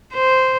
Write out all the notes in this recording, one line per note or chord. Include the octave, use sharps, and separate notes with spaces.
C5